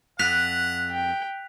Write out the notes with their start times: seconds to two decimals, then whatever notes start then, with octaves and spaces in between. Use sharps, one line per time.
0.19 F2 F#5 F#6 B6 F7
0.92 G5